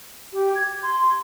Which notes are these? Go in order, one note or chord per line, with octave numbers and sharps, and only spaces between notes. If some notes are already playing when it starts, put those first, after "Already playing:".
G4
G#6
C6